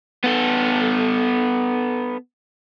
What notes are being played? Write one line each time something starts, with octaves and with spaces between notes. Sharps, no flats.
B3 A4